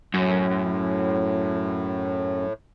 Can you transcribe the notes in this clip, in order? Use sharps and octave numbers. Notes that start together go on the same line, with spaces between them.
F#2 A2